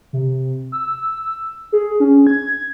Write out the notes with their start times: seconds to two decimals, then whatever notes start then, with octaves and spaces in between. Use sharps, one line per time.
0.13 C3
0.72 E6
1.72 G#4
2.00 C#4
2.27 G#6